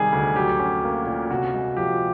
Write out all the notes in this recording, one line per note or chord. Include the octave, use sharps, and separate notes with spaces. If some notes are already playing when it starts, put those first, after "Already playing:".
Already playing: C3 D#3 G3 G#4
D2
F#3 G4
C#4
A#3
A#2
C3 F#4
G#3
F3 G4